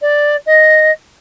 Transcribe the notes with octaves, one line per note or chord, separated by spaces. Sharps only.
D5
D#5